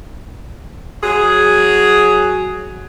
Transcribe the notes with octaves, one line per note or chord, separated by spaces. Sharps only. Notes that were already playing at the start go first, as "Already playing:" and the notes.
F#3 G#4